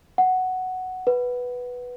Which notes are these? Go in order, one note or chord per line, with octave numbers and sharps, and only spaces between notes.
F#5
B4